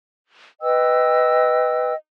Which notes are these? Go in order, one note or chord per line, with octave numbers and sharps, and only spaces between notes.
B4 D#5 G5 E6